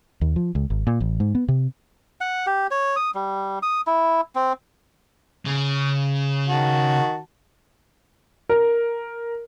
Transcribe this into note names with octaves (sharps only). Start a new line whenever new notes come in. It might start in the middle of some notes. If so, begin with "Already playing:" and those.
D#2
F3
C#2
G#1
A#2
A1
G#2
B3
C3
F#5
G4
C#5
D#6
G3
D#6
E4
C4
C#3
D#3 F#4 A5
A#4